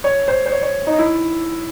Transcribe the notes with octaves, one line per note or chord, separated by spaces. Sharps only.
C#5
C5
C5
C#5
C#5
D#4
E4